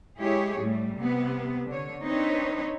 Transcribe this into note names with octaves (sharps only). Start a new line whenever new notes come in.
G#3 E4 G4 G#4 C#5
A2 G3 A3
C3 B3
D3 C#5
C4 D4 D#4 B4 C#5